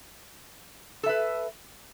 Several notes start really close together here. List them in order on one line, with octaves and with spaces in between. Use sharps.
A4 E5 B4